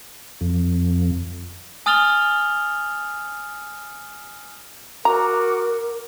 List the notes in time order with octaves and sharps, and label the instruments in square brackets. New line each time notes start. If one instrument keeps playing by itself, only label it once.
[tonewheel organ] F2
[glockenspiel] G#5 D#6 F6 A6 F7 G7
[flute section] F#4 D6 [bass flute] A#4 [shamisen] A#5